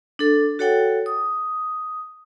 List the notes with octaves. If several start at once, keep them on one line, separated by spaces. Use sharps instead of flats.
D4 A4
F#4 A4 C#5 F#5 G5
D#6